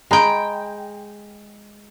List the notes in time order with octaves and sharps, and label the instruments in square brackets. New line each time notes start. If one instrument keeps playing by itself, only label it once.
[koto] G#3 G5 [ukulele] D#5 A#5 B5